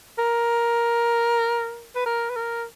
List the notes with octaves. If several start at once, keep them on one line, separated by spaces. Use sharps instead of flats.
A#4
B4
A#4
B4
A#4